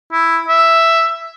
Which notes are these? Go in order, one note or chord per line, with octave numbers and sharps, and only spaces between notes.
E4
E5